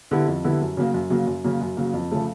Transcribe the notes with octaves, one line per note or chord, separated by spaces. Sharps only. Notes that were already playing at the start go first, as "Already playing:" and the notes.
D3 G3 B3 E4
F2
D3 G3 B3 E4
F#2
C#3 F#3 A#3
F#2
C#3 F#3 A#3
F#2
C#3 F#3 A#3
F#2
C#3 F#3 A#3
F2
C#3 F3 A3